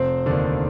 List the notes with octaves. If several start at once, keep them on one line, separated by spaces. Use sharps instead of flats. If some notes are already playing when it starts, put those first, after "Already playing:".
Already playing: F1 C4 C5
D#2 D3 D4 D5